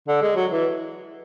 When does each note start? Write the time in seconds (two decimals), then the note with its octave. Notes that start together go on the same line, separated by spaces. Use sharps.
0.08 D3
0.22 G#3
0.36 F#3
0.51 E3